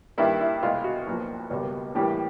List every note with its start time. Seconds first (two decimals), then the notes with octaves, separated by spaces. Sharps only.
0.18 G2 D#3 G3 A#3 E4
0.41 E4
0.63 C2 B2 G#3 B3 F4
0.84 F#4
1.07 B1 A#2 F3
1.51 C#2 B2 G3 A#3
1.95 A2 E3 G3 A#3 G4